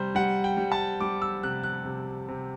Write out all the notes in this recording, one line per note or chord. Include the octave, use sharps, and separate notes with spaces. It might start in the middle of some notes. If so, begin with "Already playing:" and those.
Already playing: C3 G3 C5
G3 F#5
G5
G3
A5
G3 D6
E6
C3 F#6
F#6
C3
C3